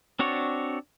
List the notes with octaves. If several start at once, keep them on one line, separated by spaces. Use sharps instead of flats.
C4 D4 F#4 C#5 D5